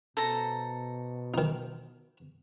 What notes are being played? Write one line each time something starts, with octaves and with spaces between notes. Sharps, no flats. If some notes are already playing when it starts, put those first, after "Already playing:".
B2 A4 C5 A#5
D#3 D#4